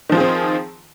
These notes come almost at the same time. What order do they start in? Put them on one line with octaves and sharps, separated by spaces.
D#3 F3 F4 G#4 C4